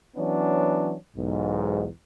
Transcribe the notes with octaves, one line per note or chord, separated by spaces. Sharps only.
E3 F#3 B3 C#4 D4
B1 E2 G#2